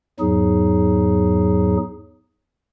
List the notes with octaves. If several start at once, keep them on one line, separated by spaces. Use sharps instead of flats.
E2 G#2 F#3 D#4 G#4